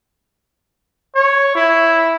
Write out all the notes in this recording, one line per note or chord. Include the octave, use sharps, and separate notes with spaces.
C#5
E4